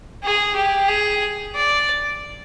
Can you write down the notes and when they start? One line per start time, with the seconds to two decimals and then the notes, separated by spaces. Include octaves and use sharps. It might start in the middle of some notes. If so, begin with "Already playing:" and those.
0.23 G#4
0.55 G4
0.88 G#4
1.55 D5